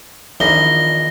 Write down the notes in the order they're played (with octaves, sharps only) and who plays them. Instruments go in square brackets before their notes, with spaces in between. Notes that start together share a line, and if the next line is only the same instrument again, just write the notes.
[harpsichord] A#1 E2 D#3 [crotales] A#6 G7